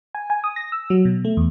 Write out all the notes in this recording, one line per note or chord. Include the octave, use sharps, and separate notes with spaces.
G#5
G#5
D#6
A#6
E6
F#3
B2
A3
E2